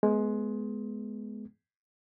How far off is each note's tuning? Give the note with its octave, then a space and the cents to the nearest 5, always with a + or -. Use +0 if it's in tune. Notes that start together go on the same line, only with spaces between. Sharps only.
G#3 +20 B3 +0